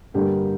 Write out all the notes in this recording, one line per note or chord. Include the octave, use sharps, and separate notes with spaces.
G2 D3 G3 A#3 G4